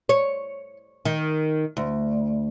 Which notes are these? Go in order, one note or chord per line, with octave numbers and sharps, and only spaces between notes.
C#5
D#3
D2